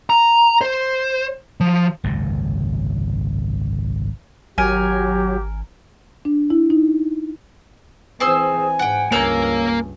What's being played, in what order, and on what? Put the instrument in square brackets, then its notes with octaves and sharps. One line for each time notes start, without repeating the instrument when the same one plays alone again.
[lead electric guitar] A#5
C5
F3
[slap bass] G#1 C#2 F#2 C3
[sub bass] G#1 [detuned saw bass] F#3 [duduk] G4 [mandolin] A#4 G#5
[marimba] D4
E4
D#4
[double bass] E3 C4 [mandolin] G#4 C5 E6 [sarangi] G#5
[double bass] G#2 [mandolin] F#5 G5
[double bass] C#2 G2 [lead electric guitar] A#3 A#4 [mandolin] C#5 E6 G6